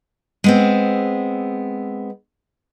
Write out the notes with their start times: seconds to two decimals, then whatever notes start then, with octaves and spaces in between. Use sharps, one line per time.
0.44 G#3 B3 C4